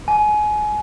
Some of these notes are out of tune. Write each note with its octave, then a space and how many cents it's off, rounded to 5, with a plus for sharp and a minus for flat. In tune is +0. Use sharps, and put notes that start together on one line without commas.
G#5 +25